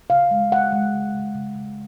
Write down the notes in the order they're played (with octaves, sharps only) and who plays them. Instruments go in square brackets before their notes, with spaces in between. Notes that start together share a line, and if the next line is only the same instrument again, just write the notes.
[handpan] C#3 F5
G#3
G#3 F#5
G#3
C#3
C#3
C#3
C#3